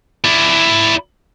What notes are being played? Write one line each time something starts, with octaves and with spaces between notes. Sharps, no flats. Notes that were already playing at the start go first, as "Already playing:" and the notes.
E4 D5